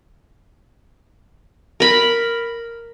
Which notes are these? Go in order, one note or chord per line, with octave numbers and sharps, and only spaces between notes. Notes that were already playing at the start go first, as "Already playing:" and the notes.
A#4 B5